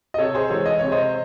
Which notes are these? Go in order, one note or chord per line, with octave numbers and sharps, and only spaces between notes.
D#5
C3 A4 C#5
G#4 C5
E3 G#3 A4 C#5
D#5
C3 C#5
C5 D#5